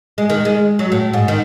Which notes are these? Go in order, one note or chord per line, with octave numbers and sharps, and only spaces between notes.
G#3
D#3
G#3
F#3
A2
G#2
D#3